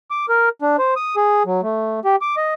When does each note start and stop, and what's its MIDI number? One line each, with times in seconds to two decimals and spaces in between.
0.11 0.26 86
0.29 0.49 70
0.62 0.76 62
0.79 0.94 72
0.96 1.16 87
1.17 1.43 68
1.46 1.61 54
1.63 2.00 57
2.05 2.16 67
2.22 2.36 86
2.37 2.54 75